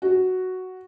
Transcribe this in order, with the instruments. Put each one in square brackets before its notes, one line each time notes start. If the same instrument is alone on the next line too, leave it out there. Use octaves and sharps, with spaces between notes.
[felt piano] F#4